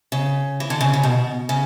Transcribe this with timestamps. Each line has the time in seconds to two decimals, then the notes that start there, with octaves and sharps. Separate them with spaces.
0.12 C#3
0.60 E3
0.70 D3
0.81 C#3
0.93 C#3
1.03 B2
1.49 C#3